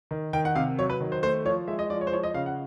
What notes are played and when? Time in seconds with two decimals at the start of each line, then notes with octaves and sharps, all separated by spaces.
0.11 D#3
0.33 D#3 G5
0.45 F#5
0.55 C3 F5
0.78 F#3 C#5
0.90 B4
1.01 D#3
1.12 C5
1.23 A3 C5
1.45 F3 C#5
1.68 G#3 E5
1.79 D#5
1.90 F3 D5
2.01 C#5
2.07 C5
2.12 F3 C#5
2.23 D#5
2.34 C#3 F5
2.46 F#5